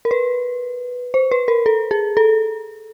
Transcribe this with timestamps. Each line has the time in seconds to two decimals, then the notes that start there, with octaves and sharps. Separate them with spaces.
0.05 A#4
0.11 B4
1.14 C5
1.31 B4
1.48 A#4
1.66 A4
1.91 G#4
2.17 A4